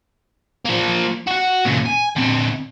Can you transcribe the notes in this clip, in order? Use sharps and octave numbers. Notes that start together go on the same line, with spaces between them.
F3 A#3
F#4 F#5
A#2 C#3
G#5
D3 C4